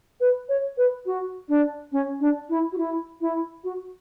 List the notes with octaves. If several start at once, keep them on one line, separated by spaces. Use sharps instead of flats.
B4
C#5
B4
F#4
D4
C#4
D4
E4
F#4
E4
E4
F#4